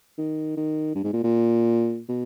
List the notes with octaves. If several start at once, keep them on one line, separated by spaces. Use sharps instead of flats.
D#3
D#3
G2
G#2
A#2
A#2
B2